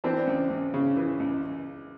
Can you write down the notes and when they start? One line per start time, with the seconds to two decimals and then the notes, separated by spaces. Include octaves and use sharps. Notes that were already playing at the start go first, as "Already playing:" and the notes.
0.04 E3 C4 D4
0.27 C#2
0.50 C#2
0.74 C#3
0.96 E3
1.20 C#2